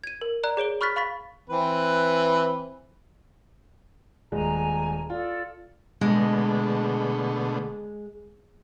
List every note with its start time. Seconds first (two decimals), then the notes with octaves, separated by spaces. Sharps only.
0.04 G#6 D#7
0.21 A#4
0.43 D5 A#5 F#6
0.57 G#4 C#5 D7 G7
0.81 B5 C#6 F6 F#6 A6 B6
0.96 F5 B5 C#6 A6 B6
1.50 E3 C4 B4
4.32 D#1 G#3 G#5 A#5
5.10 F4 A4 D5
6.01 B2 D3 G#3 A3